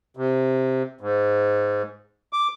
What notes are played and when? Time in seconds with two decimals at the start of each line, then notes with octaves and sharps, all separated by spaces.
0.17 C3
1.01 G#2
2.33 D6